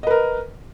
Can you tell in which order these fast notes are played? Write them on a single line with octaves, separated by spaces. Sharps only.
D#5 B4 A#4